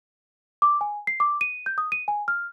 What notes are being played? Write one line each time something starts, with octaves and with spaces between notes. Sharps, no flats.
D6
G#5
C7
D6
D#7
G6
D#6
D#7
G#5
F6